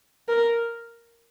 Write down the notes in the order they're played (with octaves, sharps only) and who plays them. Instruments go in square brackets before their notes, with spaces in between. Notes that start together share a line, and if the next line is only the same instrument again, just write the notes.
[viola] A#4